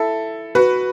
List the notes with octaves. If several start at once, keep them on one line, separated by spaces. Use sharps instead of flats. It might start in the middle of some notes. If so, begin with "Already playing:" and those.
Already playing: E4 A4
F#4 B4